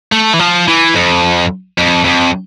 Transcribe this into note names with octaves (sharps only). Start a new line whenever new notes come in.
A3
E3
F3
E3
F2
F2
F2